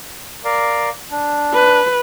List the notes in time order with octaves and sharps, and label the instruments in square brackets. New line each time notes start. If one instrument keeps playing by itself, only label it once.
[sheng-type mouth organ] A#4 D5 F5
D4
[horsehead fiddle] B4